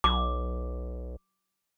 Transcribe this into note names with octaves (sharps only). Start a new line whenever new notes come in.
B1 D6